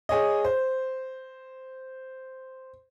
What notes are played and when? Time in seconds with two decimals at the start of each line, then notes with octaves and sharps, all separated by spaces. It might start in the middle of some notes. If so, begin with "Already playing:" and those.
0.09 G#4 C#5 D#5
0.44 C5